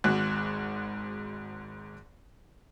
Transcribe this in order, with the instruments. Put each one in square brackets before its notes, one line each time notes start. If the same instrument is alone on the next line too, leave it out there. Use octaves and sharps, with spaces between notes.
[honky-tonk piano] G#1 G#2 F#4 F#6